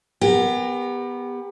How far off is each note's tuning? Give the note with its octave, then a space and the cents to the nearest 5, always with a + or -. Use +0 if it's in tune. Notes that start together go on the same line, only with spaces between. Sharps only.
B3 +0 G4 +35 A#4 +0